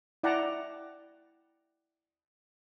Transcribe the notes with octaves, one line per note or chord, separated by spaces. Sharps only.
E4 D5 F#5 G5 A5 A#5